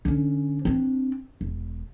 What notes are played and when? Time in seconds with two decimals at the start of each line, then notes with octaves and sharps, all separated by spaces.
0.05 D3 C#4
0.65 C4 D4
1.41 E1